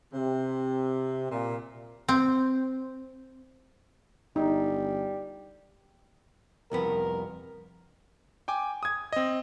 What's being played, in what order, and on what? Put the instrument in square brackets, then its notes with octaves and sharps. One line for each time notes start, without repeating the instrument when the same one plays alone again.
[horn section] C3
A#2
[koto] C4
[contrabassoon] G1 [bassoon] G3 [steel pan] D#4
[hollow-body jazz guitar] C2 F2 B3 [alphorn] A#4
[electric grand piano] G5 G#5 D6
D#6 G#6
C4 D#5